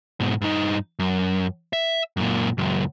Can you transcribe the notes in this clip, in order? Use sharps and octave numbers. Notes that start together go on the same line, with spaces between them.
G#2 B2
G2 D#4
F#2
E5
F#2 A#2
C#2 F#2